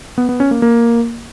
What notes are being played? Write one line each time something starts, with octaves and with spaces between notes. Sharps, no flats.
B3
B3
C#4
A#3
A#3